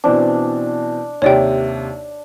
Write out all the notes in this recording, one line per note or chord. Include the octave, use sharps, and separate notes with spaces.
B2 E3 C4 D4
D#2 C3 C#5 D5 G5